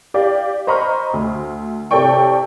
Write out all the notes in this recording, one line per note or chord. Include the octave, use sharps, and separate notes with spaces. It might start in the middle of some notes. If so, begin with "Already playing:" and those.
G4 D5 F5
C5 D#5 A#5 B5 C#6 F6
D2
C3 A4 C#5 D5 G5 C#6